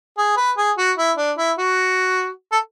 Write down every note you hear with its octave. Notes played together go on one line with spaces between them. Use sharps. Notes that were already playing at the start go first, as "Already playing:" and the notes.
G#4
B4
G#4
F#4
E4
D4
E4
F#4
A4